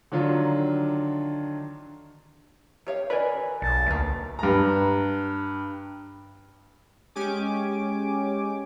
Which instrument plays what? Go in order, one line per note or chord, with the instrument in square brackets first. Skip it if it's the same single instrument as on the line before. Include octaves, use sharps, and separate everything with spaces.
[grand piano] D3 D#3 F#3 D4 F4
[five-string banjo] G4 C#5 F5
[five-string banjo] A#4 D5 D#5 [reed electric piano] B4 G#5
[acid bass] B1 [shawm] A5
[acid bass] D2 [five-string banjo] A#3 B3
[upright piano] G2 A#5
[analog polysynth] G#3 C#4 G4 G#5 D6